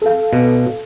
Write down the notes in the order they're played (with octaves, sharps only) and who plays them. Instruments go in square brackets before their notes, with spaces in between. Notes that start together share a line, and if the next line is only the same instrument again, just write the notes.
[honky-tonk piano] A4 F5
[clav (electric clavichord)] B2